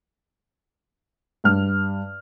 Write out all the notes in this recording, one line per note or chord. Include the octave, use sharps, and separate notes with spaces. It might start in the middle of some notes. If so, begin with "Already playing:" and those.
G2 F6